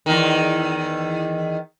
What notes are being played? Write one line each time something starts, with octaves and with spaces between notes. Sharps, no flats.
E2 D#3